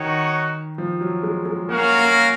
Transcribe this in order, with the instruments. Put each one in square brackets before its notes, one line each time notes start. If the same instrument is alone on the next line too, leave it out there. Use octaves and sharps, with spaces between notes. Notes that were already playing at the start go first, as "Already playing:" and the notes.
Already playing: [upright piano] D#3 [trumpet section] D#4 F#4 C#5 F#5
[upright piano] F3
F#3
G#3
G#3
[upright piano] A#3 [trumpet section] C#4 F#4 A#4 F5
[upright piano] A#3